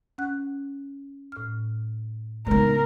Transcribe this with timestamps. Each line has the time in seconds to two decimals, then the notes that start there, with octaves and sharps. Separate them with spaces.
0.18 C#4 F#5 F#6
1.32 A2 F6
2.47 C#3 G#3 B3 D#4 A#4